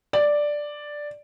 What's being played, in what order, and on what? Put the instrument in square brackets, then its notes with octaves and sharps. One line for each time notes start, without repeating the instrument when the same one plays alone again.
[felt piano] D5